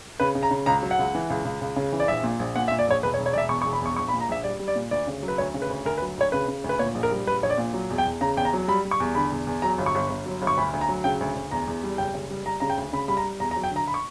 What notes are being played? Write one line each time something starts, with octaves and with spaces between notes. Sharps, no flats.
C#3 B4
C#3
A#5
C#3
C#2 A#5
F#3
F#5
C#2
E3
C#2
C#2
C#2
C#3
E3
D5
A#1 E5
A#2
A#1
A#2 F#5
E5
A#2
D5
A#1 C#5
E1 B4
C#5
E1
C#5
E1 D5 E5
E2 C#6
C#6
E1
B5
E2 C#6
A#1 C#6
B5
A#2
A#5
A#1 E5
G3 D5
G3
D5
A#2
D2 D5
C#3
F#3
B4
D2 C#5
C#3
B4
D2
D2 A#4
B4
F#3
D2 C#5
C#3 B4
C#3
D2
B4
A#2 C#5
A#1
A#4
G3
A#1 B4
A#1 C#5
D5
A#2
F#3
E2
G5
E2
C#3 A#5
E2 G5
A#5
F#3
G3 B5
G3
C#6
E2
D3 B5
E2
E2
F#3 A#5
G1
C#6
G1
G1
F#3
G1
C#6
D2 B5
D2
A#5
F#3
C#3 G5
D2
D2
E2 A#5
E2
G3
F#1 G5
F#1
G3
G3 A#5
C#3 A#5
G5
D2
C#3 B5
G3 B5
A#5
G3
E2 A#5
A#5
F#3
G5
D3
A#5
B5
C#6